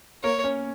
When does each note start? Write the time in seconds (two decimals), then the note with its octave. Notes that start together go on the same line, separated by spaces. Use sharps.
0.24 A#3 A#4 C#5
0.44 C#4 C#5